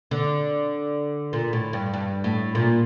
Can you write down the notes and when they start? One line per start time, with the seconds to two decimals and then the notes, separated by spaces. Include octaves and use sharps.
0.11 D3
1.33 A#2
1.53 A2
1.73 G2
1.94 G2
2.24 A2
2.55 A#2